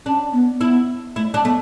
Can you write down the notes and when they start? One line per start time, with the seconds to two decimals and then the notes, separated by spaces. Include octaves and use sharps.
0.06 C#4 D4
0.33 B3
0.60 B3 E4
1.16 A3 E4
1.34 D4
1.43 A3 B3